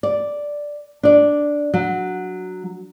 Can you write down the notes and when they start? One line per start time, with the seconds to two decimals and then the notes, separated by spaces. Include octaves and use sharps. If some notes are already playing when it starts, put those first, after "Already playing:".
0.03 D5
1.03 D4 D5
1.74 F#3